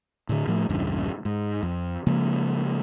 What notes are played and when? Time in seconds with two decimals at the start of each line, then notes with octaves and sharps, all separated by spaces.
0.29 A2 D3
0.47 A2 F3 A3
0.69 A#1 E2 G2 C#3
1.25 G#2
1.63 F2
2.07 C#3 F3 G#3 A#3